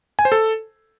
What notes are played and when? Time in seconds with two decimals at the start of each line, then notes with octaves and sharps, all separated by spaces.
0.19 G#5
0.25 C5
0.32 A4